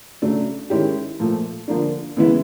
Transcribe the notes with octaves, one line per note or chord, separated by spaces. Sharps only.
C#3 F#3 A3 D4
D#3 G#3 C#4 E4 G4
A#2 F3 A3
D3 F3 A#3 D4
C#3 E3 G#3 B3 E4